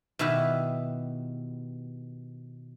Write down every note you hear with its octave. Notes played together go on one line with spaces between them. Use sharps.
B2 D#3 E4 G4 B4